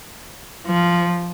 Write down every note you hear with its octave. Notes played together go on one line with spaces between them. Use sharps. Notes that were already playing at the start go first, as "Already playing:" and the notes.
F3